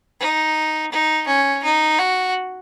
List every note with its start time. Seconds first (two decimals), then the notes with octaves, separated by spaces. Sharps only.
0.20 D#4
0.92 D#4
1.27 C#4
1.63 D#4
1.98 F#4